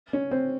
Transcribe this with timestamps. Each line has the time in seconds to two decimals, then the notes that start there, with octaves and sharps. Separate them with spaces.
0.13 C#4
0.31 C4